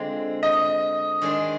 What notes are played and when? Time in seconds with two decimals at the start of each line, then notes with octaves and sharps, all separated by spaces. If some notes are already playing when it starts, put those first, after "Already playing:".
Already playing: D3 G#3 C4 F4
0.43 D#5
1.22 D#3 G#3 D4 G#4